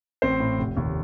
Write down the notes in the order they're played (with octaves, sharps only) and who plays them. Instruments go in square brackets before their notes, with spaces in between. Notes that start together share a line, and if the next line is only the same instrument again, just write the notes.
[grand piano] A1 C4 C5
A2
F1
D#2